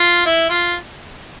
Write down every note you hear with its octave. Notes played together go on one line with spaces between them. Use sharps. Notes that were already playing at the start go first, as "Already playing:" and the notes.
Already playing: F4
E4
F4